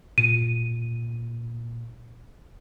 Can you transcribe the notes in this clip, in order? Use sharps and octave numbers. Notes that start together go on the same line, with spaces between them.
A#2 D#7